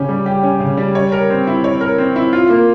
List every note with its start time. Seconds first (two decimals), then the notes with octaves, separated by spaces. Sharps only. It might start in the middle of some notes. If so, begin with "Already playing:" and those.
Already playing: C#3 C#4 G4
0.09 G3
0.26 G4
0.43 C#4
0.60 C#3
0.77 G3
0.95 C#5
1.12 A#4
1.30 C4
1.47 E4
1.64 C#5
1.81 A#4
1.98 C4
2.16 E4
2.33 F4
2.50 A#3